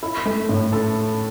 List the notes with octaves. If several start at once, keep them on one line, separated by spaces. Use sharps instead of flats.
E4
A3
A2
A4